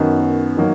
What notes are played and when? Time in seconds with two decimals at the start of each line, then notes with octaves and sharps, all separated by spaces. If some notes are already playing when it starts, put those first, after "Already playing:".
Already playing: F#2 D#3 F#3 B3
0.57 D#3 F#3 A#3